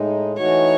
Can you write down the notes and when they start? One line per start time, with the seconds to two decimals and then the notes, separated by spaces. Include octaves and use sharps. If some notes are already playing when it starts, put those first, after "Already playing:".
Already playing: A2 G#3 D#4
0.37 E3 A3 D#4 F#4 C#5